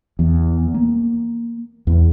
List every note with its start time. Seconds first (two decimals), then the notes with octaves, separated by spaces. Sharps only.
0.19 E2
0.74 A#3
1.87 E2